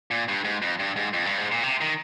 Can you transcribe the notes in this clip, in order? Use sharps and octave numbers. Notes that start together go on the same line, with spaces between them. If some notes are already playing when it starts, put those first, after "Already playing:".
A#2
G2
G#2
F2
G2
G#2
F2
G2
G#2
A#2
C3
D#3